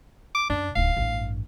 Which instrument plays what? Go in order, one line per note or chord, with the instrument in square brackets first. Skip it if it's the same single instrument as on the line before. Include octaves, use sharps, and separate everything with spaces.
[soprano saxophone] D6
[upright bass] F#2 [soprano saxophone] D4
[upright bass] D1 D#4 [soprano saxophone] F5
[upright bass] A1 G2